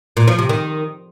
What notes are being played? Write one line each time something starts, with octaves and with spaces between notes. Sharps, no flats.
A#2
F3
C3
D#3